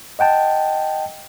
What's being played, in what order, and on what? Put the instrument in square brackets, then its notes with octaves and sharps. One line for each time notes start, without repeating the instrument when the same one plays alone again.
[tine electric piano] D#5 F#5 G5 A5